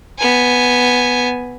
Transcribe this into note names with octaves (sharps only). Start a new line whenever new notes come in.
B3 G#5